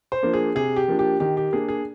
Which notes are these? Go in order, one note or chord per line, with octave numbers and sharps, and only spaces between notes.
C5
F3 A#3 D4
G#4
C3 G#4
G4
F3 A#3 D4
G4
D#3 G4
G4
A#3 D4 G#4
G#4